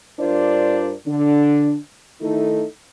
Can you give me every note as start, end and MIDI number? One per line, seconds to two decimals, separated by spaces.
0.19 0.93 43
0.19 0.93 62
0.19 0.93 65
0.19 0.93 70
0.19 0.93 72
0.19 0.93 74
1.07 1.77 50
1.07 1.77 62
2.21 2.64 51
2.21 2.64 57
2.21 2.64 63
2.21 2.64 64
2.21 2.64 69